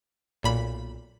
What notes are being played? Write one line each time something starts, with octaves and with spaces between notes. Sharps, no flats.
B1 A#2 B5